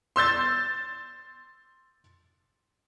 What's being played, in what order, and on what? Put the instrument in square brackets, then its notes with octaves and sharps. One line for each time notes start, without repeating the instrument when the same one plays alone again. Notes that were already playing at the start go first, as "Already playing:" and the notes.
[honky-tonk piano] C6 E6 G6 A6